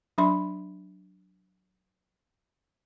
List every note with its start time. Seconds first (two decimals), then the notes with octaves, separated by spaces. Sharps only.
0.18 F#3 D4 E5 B5 C6